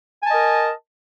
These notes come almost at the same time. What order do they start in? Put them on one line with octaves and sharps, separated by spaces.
G#5 A5 D#5 A#4